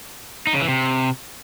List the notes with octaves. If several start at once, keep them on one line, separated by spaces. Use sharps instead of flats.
D#4
C#3
E3
C3